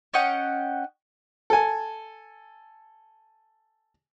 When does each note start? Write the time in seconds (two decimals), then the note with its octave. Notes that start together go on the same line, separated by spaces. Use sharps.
0.14 C#4 D#5 F#5 G5
1.50 A4 G#5